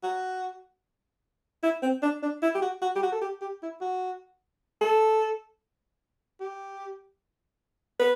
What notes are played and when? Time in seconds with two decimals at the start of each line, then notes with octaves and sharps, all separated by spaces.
0.03 F#4
1.63 E4
1.82 C4
2.02 D4
2.22 D4
2.42 E4
2.55 G4
2.62 F#4
2.82 F#4
2.96 G4
3.03 F#4
3.12 A4
3.22 G4
3.41 G4
3.62 E4
3.81 F#4
4.81 A4
6.40 G4
8.00 B4